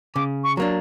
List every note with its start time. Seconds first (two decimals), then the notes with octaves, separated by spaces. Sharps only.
0.15 C#3 D6
0.44 C#6
0.57 F#3 A#3 D4